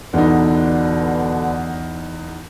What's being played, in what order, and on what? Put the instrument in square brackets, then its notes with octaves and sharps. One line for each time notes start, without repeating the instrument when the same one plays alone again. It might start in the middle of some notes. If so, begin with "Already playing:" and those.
[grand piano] E2 D#4 [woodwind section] B2 D3